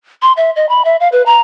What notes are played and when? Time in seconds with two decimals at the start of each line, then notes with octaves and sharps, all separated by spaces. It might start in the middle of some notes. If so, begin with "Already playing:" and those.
0.22 C6
0.37 E5
0.56 D#5
0.69 B5
0.85 E5
1.00 F5
1.12 B4
1.26 A#5